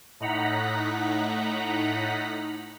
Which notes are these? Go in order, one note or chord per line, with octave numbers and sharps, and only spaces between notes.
A2 D#4 F#5 A#5 B6